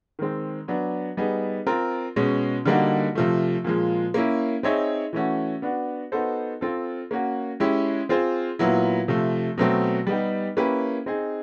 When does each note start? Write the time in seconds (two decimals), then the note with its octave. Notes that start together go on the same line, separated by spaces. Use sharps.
0.19 D#3 G#3 C4
0.68 F#3 B3 D4
1.17 G3 B3 D#4 G#4
1.67 C4 F4 A#4
2.16 B2 G#3 C#4
2.66 D3 G3 A#3 D#4 F#4
3.15 C3 F3 A3
3.65 A#2 F3 G#3
4.14 A#3 C#4 E4
4.63 C4 D#4 G#4 C#5 E5
5.13 E3 A3 C#4 F#4
5.62 B3 D4 F#4
6.12 B3 D#4 F#4 A4 C5
6.61 C4 F4 A4
7.11 A#3 C#4 F#4
7.60 G#3 C#4 E4 G4
8.09 C4 F4 G#4 C5
8.59 A#2 F#3 B3 E4
9.08 C3 F3 A3
9.58 B2 F#3 A3 C4
10.07 G3 B3 D#4 G4
10.57 A#3 C#4 E4 G4 B4
11.06 C4 D#4 G#4